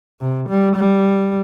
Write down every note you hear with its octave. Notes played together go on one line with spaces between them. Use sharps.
C3
G3
G3